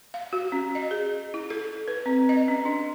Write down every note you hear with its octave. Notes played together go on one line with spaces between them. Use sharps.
F5
F#4
C#4
D#5
G#4
E4
A4
B4
C4
D#5
C#4
D4